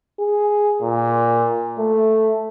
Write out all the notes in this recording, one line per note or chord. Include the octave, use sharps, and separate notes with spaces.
G#4
A#2
A3